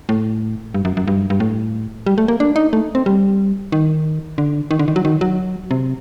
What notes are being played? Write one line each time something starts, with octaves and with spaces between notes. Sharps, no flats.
A2
G2
F#2
F#2
G2
G2
A2
G3
A3
A#3
D4
D#4
A3
C4
G3
D#3
D3
D#3
D3
D#3
F#3
D#3
F#3
C3